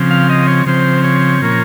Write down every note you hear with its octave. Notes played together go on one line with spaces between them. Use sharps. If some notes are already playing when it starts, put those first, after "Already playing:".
Already playing: C#3 F3 C4
F5
D#5
C#5
C#3 F3 C4 C5
C#5
A#2 F3 A#3 C#4